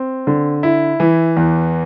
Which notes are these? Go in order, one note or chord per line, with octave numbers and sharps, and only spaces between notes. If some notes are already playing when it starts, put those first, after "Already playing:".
Already playing: C4
D3
E4
E3
E2